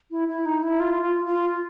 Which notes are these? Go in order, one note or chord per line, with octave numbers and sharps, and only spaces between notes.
E4
E4
D#4
E4
F4
F4
F4